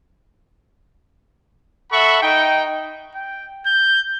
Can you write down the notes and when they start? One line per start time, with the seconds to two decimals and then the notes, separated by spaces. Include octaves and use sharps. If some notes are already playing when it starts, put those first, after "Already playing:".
1.92 A4 E5 F#5 B5 C#6
2.22 D#4 D#5 G5
3.15 G5
3.66 G6